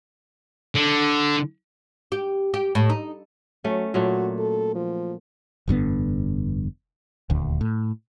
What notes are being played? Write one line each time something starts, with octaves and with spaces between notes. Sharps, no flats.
D3
G4
G4
A2
D#4
F#3 A3 C#4
A#2 F#3 A3 F#4
A4
F3
F1 G2 D3 B3
D#1 D2
A2